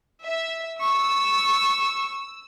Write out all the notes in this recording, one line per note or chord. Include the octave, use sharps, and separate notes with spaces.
E5
C#6 E6